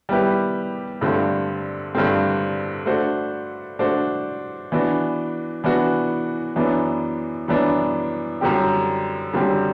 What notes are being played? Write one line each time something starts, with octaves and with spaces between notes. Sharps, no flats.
G3 B3 E4 G4 B4
G2 D3 A3 C4
G2 D3 A3 C4
A3 D4 F#4 C5
A3 D4 F#4 C5
E3 B3 D4 F#4
E3 B3 D4 F#4
F#2 E3 B3 D4
F#2 E3 B3 D4
F#2 D3 G3 C4 G4
F#2 D3 G3 C4 G4